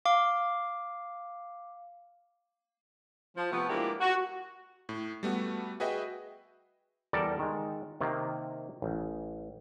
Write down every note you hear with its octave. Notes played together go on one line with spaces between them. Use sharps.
F5 D6
F3
C3 F3 A3 B3
G#3 A#3 D4 E4 F4 G4
F#4
A2
G3 A3 B3 F#4
F#4 G#4 B4 D#5 E5 G5
E2 G3 A4 A#4 D5
D#3 G#3
C3 D#3 A#3
A1